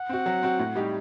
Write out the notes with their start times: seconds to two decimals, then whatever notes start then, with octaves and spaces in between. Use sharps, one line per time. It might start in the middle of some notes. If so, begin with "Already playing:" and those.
Already playing: F#5
0.09 C4 F#4
0.26 F#3
0.43 C4 F#4
0.59 A2
0.75 G3 D#4 G4